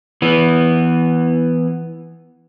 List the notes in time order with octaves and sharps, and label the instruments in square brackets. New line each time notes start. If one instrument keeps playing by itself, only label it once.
[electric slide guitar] E3 B3